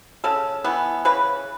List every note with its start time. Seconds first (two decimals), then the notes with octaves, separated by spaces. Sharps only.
0.24 C#3 A4
0.64 E3 B3
1.05 C#3 B4